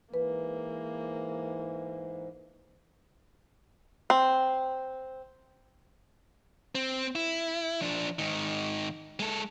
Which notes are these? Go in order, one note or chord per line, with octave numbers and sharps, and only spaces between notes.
G#2 E3 A#3 B4
C4
C4
E4
F3 D4
G#2 D#3
G#3 A4